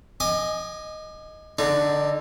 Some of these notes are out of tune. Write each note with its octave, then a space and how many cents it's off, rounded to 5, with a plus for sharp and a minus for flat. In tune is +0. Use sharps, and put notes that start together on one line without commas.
D#5 +0 G#5 +0 D6 +40
D3 +0 D#4 -25